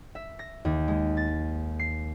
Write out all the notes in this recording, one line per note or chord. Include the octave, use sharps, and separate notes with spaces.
E5
A#6
D#2
G#3
A6
C7